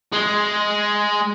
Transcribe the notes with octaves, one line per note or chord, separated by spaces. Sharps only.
G#3